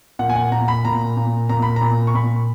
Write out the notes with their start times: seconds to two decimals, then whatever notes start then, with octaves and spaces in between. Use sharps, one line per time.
0.19 A#2 F#5
0.30 G#5
0.36 F#5
0.52 A#2 A#5
0.68 B5
0.85 A#2 A#5
1.17 A#2
1.49 A#2 A#5
1.62 B5
1.76 A#5
1.82 A#2
2.07 C#6
2.15 A#2 B5